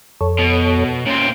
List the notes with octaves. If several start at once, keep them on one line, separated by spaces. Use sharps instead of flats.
F2 A4 C#5
B2
A#2 C4 C#4